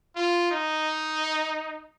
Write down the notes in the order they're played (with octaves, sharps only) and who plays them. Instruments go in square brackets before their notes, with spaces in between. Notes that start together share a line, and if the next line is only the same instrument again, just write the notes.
[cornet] F4
D#4